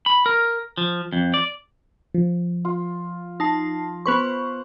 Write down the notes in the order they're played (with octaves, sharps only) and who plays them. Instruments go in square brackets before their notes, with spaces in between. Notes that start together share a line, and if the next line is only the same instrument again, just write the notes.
[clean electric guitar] B5
A#4
F3
F2
D5
[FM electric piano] F3
[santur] F4
[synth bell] D#4 A5 C7
[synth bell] B3 B4 C#6 [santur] C5